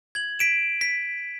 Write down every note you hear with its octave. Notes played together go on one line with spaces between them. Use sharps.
G#6 F#7
B6 D7 E7
B6